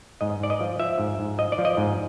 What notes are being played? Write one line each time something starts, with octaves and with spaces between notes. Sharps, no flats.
G#2 D#5
G#2 D5
D#5
F3
F3 E5
G#2
G#2
F3 D#5
D5
F3
D#5
G#2